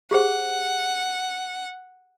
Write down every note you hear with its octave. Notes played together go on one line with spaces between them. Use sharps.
G4 G#4 C5 F#5